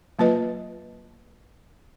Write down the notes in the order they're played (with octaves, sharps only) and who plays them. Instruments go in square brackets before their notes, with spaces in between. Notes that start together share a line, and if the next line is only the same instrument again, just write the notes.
[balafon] F#3 A#3 F4 B4 D#5